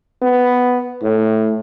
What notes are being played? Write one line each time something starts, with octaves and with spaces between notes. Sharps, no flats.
B3
A2